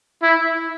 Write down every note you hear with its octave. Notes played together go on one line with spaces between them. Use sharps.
E4